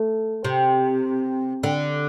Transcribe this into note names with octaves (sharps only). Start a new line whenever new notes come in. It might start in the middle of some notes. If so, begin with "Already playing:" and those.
Already playing: A3
C3
D3